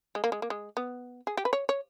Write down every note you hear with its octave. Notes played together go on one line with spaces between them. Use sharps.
G#3
A#3
G#3
A#3
G#3
B3
G#4
G4
B4
C#5
C#5